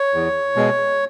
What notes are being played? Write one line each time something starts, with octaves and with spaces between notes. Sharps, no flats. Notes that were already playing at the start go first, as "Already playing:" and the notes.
Already playing: C#5
E2
B2 G#3